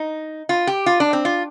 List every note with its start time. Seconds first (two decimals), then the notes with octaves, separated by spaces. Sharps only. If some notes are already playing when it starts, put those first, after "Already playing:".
Already playing: D#4
0.49 F4
0.67 G4
0.86 F4
1.00 D4
1.13 C4
1.25 F4